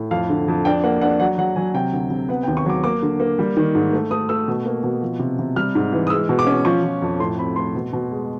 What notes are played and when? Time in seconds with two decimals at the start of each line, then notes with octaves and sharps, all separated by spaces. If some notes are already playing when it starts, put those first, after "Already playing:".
Already playing: A2
0.11 F2 F5
0.29 D3
0.48 F2
0.65 D4 G5
0.84 A#3 F#5
1.01 D4 F#5
1.20 F#3 F#5
1.38 F#3 F#5
1.56 F#3 G#5
1.74 C3 G5
1.93 D2
2.10 C3
2.29 B3 F#5
2.43 G5
2.48 D#2
2.57 C#6
2.66 F#3 D6
2.84 A#3 D6
3.02 D3
3.20 A#3
3.39 G3
3.57 D#3
3.75 G#2
3.93 A3
4.11 A3 D#6
4.29 A3 E6
4.48 B2
4.65 A#3
4.83 B2
5.02 F3
5.19 C3
5.39 C3
5.56 G3 F6
5.75 G#2
5.93 E3
6.07 D#6
6.10 G#3 E6
6.29 B2
6.39 D6
6.47 C#4
6.65 F3 C#6
6.83 F3
7.02 F2
7.19 A2 C6
7.38 C4 B5
7.56 A3 C6
7.75 B2
7.93 B2
8.11 G#3